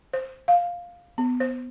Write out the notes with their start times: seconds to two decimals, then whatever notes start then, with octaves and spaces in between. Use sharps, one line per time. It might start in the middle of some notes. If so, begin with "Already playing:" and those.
0.13 C5
0.48 F5
1.18 B3
1.40 C5